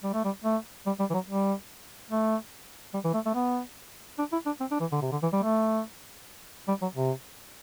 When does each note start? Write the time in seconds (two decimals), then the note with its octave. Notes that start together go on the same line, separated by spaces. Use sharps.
0.04 G3
0.13 A3
0.24 G3
0.44 A3
0.86 G3
1.00 G3
1.10 E3
1.14 F#3
1.28 G3
2.11 A3
2.94 G3
3.04 E3
3.14 A3
3.26 A3
3.35 B3
4.19 D4
4.32 E4
4.46 D4
4.60 C4
4.71 D4
4.80 E3
4.92 D3
5.02 C3
5.12 D3
5.22 E3
5.33 G3
5.43 A3
6.68 G3
6.82 F#3
6.95 C3